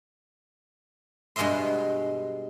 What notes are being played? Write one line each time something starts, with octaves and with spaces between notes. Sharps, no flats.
G2 B2 G#3 D#5 E5 C6